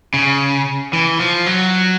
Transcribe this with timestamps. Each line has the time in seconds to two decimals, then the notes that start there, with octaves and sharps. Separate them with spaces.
0.14 C#3
0.93 E3
1.19 F3
1.46 F#3